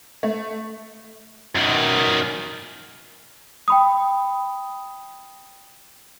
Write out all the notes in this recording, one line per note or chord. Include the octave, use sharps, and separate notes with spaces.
A3
F#2 D#3
G5 B5 D#6